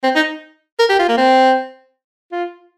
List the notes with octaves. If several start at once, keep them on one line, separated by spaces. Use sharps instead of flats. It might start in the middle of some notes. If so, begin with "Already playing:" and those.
C4
D#4
A#4
G4
F4
A#3
C4
F4